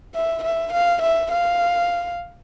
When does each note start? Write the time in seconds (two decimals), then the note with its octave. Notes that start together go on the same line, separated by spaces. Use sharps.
0.14 E5
0.44 E5
0.73 F5
1.02 E5
1.31 F5